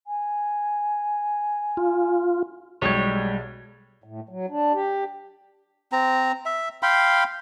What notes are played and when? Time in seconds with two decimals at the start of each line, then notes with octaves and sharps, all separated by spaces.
0.07 G#5
1.77 F4
2.82 B1 G3 G#3 C#5 G#6
4.04 A2
4.29 F#3
4.50 D4
4.73 G4
5.92 C4 A#5
6.46 E5
6.83 F5 G5 B5 C6